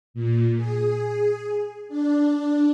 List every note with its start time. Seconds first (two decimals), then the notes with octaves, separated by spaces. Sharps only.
0.14 A#2
0.57 G#4
1.89 D4